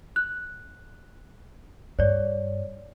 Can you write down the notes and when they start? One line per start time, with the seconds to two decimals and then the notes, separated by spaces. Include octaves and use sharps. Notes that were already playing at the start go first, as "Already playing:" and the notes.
0.16 F#6
1.99 G2 C#5 D5